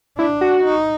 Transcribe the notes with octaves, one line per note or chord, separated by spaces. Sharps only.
D4 E4
F#4
D#4